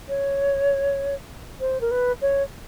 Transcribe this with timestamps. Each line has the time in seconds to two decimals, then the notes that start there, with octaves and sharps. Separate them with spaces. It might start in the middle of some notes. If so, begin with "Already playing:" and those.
0.09 C#5
1.60 C5
1.81 A#4
1.91 B4
2.21 C#5